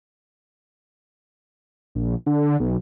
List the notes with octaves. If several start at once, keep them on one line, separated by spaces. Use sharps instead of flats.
A#1
D3
B1